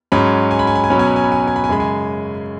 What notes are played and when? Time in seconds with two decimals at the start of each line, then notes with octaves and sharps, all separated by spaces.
0.12 G#2 F#3 C#4 B5
0.51 G#5
0.59 B5
0.67 G#5
0.75 B5
0.84 G#5
0.90 B2 F#3 C#4 B5
0.99 G#5
1.07 B5
1.16 G#5
1.24 B5
1.32 G#5
1.40 B5
1.47 G#5
1.56 B5
1.64 G#5
1.69 F#2 C#3 G#3 B5
1.80 G#5